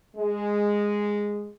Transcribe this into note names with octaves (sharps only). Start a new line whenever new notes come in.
G#3